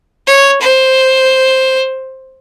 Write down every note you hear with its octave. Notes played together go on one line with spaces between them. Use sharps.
C#5
C5